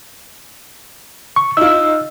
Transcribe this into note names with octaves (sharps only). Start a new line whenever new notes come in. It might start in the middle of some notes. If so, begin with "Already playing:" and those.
C#6
D#4 F4 E6